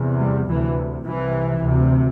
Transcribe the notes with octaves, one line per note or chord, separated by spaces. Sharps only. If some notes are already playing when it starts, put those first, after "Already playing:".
Already playing: E2 C3
G3
D2 C3 E3
C2 C3 E3
D2 C3